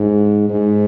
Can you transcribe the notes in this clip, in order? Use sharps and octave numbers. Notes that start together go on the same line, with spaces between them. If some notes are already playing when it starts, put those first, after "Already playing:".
Already playing: G#2
G#2